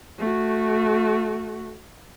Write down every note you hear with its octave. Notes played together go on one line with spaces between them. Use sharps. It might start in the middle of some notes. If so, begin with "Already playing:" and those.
A3 F#4